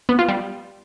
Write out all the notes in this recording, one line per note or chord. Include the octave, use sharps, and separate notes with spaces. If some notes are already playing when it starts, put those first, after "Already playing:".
B3
F4
G3